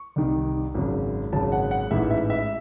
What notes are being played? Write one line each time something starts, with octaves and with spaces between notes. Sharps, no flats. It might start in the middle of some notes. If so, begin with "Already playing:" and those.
Already playing: C#6
C2 C3 D#3
G#1 F#2 C#3
G#1 F#2 C#3 A5
F#5
F#5
A1 G#2 E3 E5
E5
E5